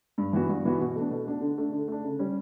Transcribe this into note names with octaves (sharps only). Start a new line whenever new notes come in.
G2
E3 B3 F#4
G2
E3 B3 F#4
B2
A3 D4
B2
A3 D4
D3
A3 D4
D3
A3 D4
C#3
G3 C#4